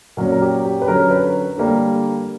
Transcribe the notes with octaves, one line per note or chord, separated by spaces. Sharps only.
A#2 F#3 C#4 F#4
A#4
G4
G4
B4
D3 F#3 C#4 A#4
B4
D3 G3 A#3